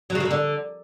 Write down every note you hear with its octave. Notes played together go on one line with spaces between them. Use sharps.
F#3
C#3
F#3
C#3
D3